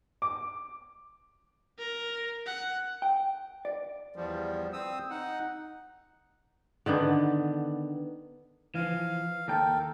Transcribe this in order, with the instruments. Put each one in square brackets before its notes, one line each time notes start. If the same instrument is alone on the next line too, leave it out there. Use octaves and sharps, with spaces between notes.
[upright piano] D6
[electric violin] A#4
F#5
[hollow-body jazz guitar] G5
D5
[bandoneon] E2 F3 G3
C4 D#6 E6
D#4 F#5
[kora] D3 D#3 B3 D4
[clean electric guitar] E3 F3 [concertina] F5
[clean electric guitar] D#2 G5 [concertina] A4 A#4